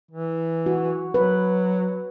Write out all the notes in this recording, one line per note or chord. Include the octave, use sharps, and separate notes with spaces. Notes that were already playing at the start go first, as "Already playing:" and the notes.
E3
F#4
F#3 B4